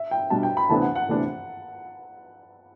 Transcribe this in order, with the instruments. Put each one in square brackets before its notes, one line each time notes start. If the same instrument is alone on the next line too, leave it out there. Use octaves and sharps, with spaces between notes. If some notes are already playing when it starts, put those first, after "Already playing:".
Already playing: [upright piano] E5
G5
[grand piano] B2 G3 D4 [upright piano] A5
[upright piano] G5
B5
[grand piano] D2 C3 E3 B3 D4 [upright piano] A5
[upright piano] F#5
F#5
[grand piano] D2 C3 E3 B3 D4